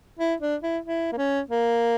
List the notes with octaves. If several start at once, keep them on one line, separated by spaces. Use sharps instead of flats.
E4
D4
E4
E4
A#3
C#4
A#3